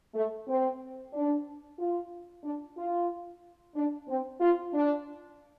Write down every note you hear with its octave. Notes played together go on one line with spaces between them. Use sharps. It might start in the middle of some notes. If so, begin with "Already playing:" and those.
A3
C4
D4
F4
D4
F4
D4
C4
F4
D4